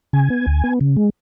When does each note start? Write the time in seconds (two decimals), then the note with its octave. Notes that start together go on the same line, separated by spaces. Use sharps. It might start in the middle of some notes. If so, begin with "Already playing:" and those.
0.13 C#3 G#5
0.30 B3
0.47 D2
0.64 B3
0.81 C#3
0.96 G#3